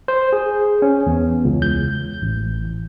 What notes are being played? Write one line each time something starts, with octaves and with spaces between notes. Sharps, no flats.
C5
G#4
C#4
E2
C#2
G6
A1